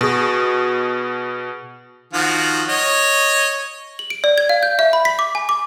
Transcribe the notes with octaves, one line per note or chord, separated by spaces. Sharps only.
B2 F#4 G#4
D#3 F3 F#4
C#5 D#5
F#7
D7
D5
G#6
F5
G6
E5
B5
B6
D6
G#5
D6